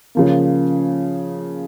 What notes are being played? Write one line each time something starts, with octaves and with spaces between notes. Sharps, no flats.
C#3 F3 A#3